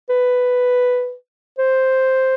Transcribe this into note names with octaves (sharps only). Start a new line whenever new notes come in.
B4
C5